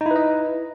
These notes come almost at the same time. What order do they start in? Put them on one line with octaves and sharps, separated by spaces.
D#4 E4 B4 D#5